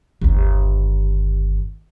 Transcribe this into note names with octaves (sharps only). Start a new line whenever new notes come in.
G1 D#2